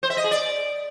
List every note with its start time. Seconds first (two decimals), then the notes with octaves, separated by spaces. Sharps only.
0.03 C5
0.10 E5
0.17 D#5
0.24 G#4
0.31 D5